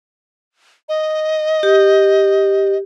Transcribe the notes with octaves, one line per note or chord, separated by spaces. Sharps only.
D#5
G4